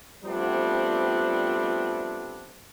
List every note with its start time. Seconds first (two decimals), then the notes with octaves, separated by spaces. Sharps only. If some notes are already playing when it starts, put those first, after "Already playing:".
0.25 F3 G3 A3 B3 C4 D4